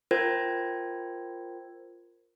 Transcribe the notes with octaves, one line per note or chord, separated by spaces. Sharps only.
F4 A#4 C5 G5 G#6